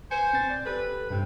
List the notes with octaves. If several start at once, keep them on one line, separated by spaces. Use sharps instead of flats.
B4 C5 G#5 C#7
C4 A6
D5
G4 A4 B4
G2 C3